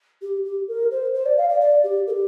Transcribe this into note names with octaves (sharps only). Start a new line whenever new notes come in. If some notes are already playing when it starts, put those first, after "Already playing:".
G4
G4
A#4
C5
C5
D5
F5
D5
D5
G4
A#4
G4